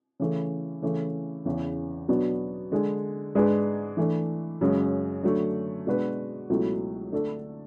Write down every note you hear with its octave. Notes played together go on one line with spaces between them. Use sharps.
C#3 E3 A3
C#3 E3 A3
E2 C#3 E3
B2 F#3 B3 D4
D3 G#3 D4 G#4
G#2 G#3 D4 G#4 B4
E3 A3 D4
F#2 C#3 G#3
D3 F#3 A3
B2 G#3 D4 F#4 B4
C#2 B2 F#3 A3 E4
D3 A3 D4 A4